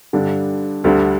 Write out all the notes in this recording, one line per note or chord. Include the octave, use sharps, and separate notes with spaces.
G2 D3 G3 D4
D2 D3 G3